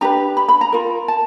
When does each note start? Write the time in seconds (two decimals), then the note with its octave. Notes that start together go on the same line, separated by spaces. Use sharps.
0.01 D4 G4 B4 A#5
0.37 B5
0.48 B5
0.61 A#5
0.72 F4 A#4
1.08 A5